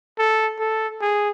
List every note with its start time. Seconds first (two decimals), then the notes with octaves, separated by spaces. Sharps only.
0.19 A4
0.59 A4
1.01 G#4